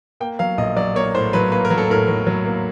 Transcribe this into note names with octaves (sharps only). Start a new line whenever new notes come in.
A#3 G5
F#3 F5
A#1 D#5
F#3 D5
A#3 C#5
A2 C5
F#3 B4
A#3 B4
A#4
F#3
A4
A2 A#4
F#3
F#3
A#3